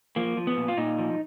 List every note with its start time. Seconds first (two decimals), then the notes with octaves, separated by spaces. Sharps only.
0.16 F3 A#3
0.37 F3
0.47 B3
0.57 A#2
0.68 F4
0.77 A#2 D#4
0.98 F3